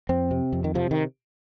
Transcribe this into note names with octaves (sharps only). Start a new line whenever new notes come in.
F2 C4
C3
F2
D#3
C3 F3
D#3